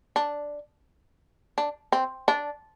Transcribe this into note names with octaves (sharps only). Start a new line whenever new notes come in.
D4
D4
C4
D4